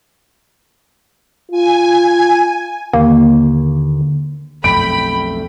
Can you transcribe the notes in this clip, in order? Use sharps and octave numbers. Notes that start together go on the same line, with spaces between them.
F4 G#5
D#2 D3 A#3
B1 F2 A3 G5 B5 D7